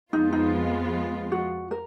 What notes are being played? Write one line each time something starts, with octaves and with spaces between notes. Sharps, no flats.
F2 F3 G#3 B3 D#4 F4
D#4
F#4
A#4